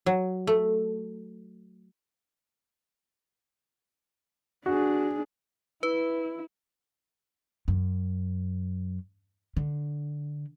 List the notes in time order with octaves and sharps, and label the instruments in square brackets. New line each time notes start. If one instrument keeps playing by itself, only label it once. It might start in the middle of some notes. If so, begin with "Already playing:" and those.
[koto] F#3
A3
[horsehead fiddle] D4 G#4 [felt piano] F#4
[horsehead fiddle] E4 [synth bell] B4
[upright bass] F#2
D3